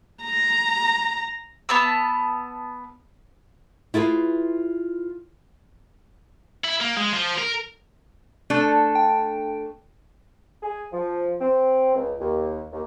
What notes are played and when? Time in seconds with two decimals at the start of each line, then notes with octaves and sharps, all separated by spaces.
0.24 A#5
1.69 B3 A5 E6
3.94 E4 F4 G#4 A4 B4
6.64 E4
6.81 A#3
6.97 G#3
7.13 F3
7.38 A#4
8.50 A3 D4 A4
8.95 G5
10.63 G#4
10.93 F3
11.40 C4
11.95 C#2
12.20 D#2
12.72 D#2